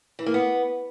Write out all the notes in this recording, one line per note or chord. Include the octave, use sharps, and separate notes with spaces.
E3
A#3
B3